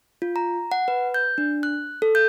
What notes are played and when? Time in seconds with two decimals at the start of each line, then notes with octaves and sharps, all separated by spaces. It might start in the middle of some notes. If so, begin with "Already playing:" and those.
0.22 F4
0.36 A#5
0.72 F#5
0.88 B4
1.14 G6
1.38 D4
1.63 F#6
2.02 A4
2.15 G6